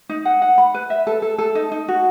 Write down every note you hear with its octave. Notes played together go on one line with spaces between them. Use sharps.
D#4
F#5
F#5
B5
B4
E5
A4
A4
A4
D#4
D#4
F#4